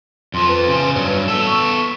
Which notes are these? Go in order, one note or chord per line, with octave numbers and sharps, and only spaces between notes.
F2 F3 C6
B4
C#3 C5
G2 F#3
B3 A4 E6
C#6